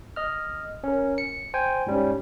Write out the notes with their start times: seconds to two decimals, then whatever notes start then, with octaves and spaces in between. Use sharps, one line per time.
0.16 D#5 F6
0.84 C#4 A#4
1.18 C#7
1.54 C5 G5 G#5
1.87 G#2 G3 C#4